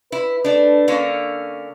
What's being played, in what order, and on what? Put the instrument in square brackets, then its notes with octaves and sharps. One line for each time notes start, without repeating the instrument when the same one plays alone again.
[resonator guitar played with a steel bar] E4 [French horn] B4
[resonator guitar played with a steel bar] A3 D4
D3 A#3 C#4